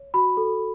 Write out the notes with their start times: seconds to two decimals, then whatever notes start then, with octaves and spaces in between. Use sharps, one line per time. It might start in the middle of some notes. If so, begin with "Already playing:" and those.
Already playing: C#5
0.14 F#4 B5
0.37 A4